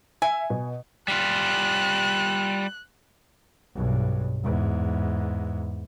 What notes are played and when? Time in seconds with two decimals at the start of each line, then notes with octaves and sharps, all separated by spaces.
0.22 E5 G#5
0.50 B2
1.08 G3 F4 F#6
3.75 B1 G2
4.44 E2 G#2